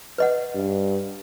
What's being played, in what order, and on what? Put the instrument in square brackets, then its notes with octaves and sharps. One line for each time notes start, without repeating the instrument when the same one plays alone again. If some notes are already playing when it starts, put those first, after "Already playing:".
[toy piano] B4 D#5 F#5
[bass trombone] G2